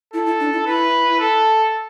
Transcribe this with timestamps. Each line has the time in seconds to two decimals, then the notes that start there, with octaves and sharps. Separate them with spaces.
0.14 E4 A4
0.26 E4
0.40 D4
0.53 E4
0.66 E4 B4
1.20 A4